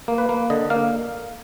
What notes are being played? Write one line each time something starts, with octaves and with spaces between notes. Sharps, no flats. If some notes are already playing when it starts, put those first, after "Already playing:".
A#3
B4
A#3
D3 D#5
A#3 F5